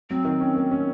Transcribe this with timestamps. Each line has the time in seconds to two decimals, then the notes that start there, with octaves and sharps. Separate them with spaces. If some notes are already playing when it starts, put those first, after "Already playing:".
0.10 F#3 C4
0.25 D#3
0.41 C#4
0.55 A#3
0.71 C#4